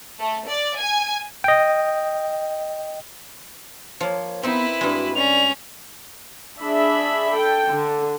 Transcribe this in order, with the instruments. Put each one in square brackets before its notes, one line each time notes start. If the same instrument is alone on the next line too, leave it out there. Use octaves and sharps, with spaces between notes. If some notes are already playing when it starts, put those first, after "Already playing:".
[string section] A3
D5
G#5
[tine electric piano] D#5 G5
[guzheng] F3 A#3 [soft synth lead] C#5
[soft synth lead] B3 [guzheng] C4 D#4 [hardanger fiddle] E4 B4
[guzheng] G2 G#3 [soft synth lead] F#4
[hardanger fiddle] C#4 [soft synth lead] D5 [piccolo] F7
[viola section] D4 G#4 E5 B5
A4 G5
D3